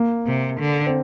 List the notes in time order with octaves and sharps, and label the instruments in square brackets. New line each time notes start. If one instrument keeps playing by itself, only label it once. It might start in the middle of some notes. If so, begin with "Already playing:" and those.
Already playing: [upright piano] A#3
[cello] C3
D3
[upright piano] C4